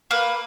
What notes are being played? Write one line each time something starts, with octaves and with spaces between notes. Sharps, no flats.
A#3 B4